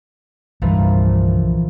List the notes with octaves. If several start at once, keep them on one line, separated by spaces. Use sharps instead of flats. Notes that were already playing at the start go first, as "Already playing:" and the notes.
C2 G2 A#2 E3 F3